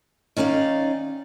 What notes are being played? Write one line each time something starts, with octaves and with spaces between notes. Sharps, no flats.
D#3 C#4 D#4 D5 F5